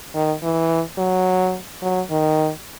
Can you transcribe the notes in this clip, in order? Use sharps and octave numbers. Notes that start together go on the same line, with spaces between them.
D#3
E3
F#3
F#3
D#3